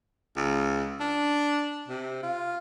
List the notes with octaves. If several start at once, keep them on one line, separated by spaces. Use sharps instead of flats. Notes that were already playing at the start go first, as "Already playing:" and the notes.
C#2
D4
C3
F4